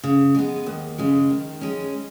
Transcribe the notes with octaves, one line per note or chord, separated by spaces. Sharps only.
C#3
G#3 B3
D#2
C#3 G#3
D#3
G#3 C#4